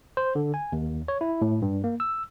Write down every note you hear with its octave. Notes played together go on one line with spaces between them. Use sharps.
C5
D3
G#5
D#2
C#5
E4
A2
G2
A#3
E6